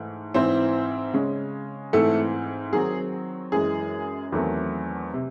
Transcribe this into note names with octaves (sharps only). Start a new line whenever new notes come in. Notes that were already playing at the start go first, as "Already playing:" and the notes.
Already playing: G#2 E3 A3
G#2 E3 C4 E4 C5
C#3 G#3 C#4
G#2 E3 A3 C4 A4
D#3 F#3 C4 G#4
F#2 E3 G#3 G#4
E2 D#3 F#3 A3 C4
C3